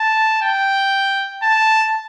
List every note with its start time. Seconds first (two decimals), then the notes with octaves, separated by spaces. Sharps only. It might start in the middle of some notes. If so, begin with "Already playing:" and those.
Already playing: A5
0.42 G5
1.42 A5